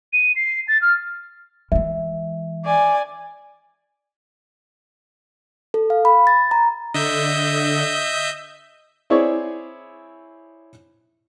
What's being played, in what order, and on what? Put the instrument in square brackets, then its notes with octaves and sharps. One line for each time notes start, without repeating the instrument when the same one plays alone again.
[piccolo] D#7
C7
A6
F6
[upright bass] E3 G#3 [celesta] E5
[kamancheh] D5 G#5
[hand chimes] A4
F5
B5
A6
A#5
[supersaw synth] D3 [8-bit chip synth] D#5 E5 G6
[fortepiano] C4 E4 G#4 C#5 D5